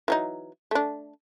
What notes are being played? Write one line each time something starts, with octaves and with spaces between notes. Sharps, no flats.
E3 F#3 D#4
A3 D4